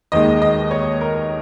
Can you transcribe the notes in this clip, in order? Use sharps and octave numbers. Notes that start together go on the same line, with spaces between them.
D#2 D#3 G#3 D#5
D#5
C#5
A#4